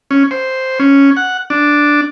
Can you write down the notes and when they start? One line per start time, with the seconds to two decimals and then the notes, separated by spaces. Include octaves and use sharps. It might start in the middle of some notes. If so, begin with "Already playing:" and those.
0.11 C#4
0.31 C5
0.80 C#4
1.17 F#5
1.50 D4